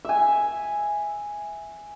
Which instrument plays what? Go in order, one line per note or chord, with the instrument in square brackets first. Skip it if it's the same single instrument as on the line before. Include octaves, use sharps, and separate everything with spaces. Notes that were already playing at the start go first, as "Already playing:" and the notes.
[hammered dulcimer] E5 G#5